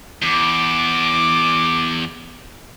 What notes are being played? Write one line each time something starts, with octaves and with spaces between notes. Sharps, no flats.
E2 D6